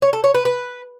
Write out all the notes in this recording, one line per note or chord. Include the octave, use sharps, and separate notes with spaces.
C#5
A4
C#5
B4
B4